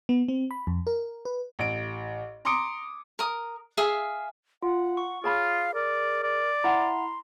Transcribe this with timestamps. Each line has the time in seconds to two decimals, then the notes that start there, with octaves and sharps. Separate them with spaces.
0.09 B3
0.28 C4
0.51 B5
0.67 F2
0.87 A#4
1.25 B4
1.59 A1 D7
2.45 A#5 C6 D6 D#6 C#7 D7
3.19 A#4 D#6
3.77 G#4 E5 F5
4.63 F4 F#5
4.97 C#6
5.24 F4 G#4 C#5 F5 A5 B5
5.74 A#4 D5
6.23 D5
6.64 E4 E5 F#5 A5 A#5 C6